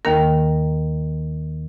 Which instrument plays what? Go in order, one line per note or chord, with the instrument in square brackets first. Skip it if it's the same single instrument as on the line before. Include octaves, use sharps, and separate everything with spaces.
[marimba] D#2 D#3 A#3 A#4